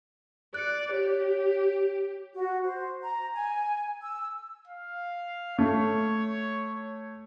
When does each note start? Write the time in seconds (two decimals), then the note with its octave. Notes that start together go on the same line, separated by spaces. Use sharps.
0.54 D5 F#6 C#7
0.92 G4 C#5
2.34 F#4
2.64 C5
3.02 A#5
3.35 G#5
4.02 E6
4.68 F5
5.59 A3 C#5